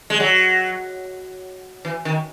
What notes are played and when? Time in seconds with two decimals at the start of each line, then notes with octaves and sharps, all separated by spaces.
0.10 G#3
0.20 F#3
1.85 E3
2.05 D#3